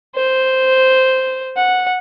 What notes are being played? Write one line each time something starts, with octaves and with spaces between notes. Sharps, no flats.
C5
F#5